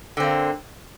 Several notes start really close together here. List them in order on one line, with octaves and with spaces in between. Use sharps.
D3 C4 A#3